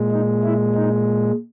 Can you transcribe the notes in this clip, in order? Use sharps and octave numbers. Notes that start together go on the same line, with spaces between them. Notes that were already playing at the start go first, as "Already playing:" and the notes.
Already playing: A#2 G#3
D#4
E4
D#4